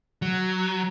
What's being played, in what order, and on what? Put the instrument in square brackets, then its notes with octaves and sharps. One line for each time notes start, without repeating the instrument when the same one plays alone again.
[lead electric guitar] F#3